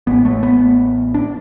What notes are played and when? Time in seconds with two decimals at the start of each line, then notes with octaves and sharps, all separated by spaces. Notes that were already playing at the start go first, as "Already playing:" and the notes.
0.07 A1 A2 B3
0.25 A3
0.43 B3
1.14 D4